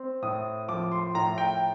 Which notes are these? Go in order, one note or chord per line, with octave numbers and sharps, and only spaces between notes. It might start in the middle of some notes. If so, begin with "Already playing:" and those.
Already playing: C4
A2 D#6
F3 D6
C6
A2 A#5
G5